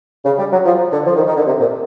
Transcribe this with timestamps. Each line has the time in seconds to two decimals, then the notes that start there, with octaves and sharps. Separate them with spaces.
0.25 C#3
0.38 G3
0.51 F#3
0.65 F3
0.92 D3
1.06 F3
1.16 D#3
1.26 D#3
1.36 D3
1.46 C3
1.60 A#2